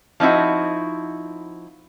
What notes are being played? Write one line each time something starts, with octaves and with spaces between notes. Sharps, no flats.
F3 C4 D#4 E4 F#4